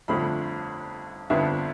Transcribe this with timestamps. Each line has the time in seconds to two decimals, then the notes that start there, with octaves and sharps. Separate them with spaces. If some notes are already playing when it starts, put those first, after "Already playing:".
0.08 G1 F2 D3 F3 A3 B5
1.30 G1 F2 D3 F3 B3 E5